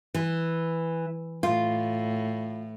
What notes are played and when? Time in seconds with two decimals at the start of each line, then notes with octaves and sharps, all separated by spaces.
0.14 E3
1.43 A2 F4